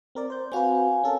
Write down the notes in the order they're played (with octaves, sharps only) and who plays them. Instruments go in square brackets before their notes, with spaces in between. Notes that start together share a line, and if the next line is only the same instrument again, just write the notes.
[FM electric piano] C4 A#4 D5
C5 G6
[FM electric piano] C4 F#4 B4 [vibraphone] F5 G#5
[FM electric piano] C#4 A4 A#4